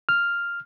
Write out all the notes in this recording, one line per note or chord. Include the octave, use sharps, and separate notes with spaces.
F6